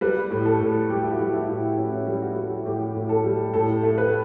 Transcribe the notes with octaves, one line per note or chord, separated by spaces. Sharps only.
G3 B4
A2
A4
A2
G3 G4
E4
F#4
G3
E4
A2
A2 C#4
G3
F#4
G3
A2 G4
A2
A4
G3
A2 A4
A3
B4